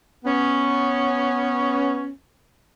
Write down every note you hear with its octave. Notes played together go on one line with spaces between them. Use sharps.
B3 C#4